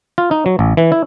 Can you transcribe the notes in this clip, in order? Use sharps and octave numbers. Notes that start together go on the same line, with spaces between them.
F4
D#4
F#3
A1
E3
E4